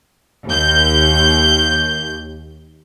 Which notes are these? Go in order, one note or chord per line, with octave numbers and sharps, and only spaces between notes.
D#2 G6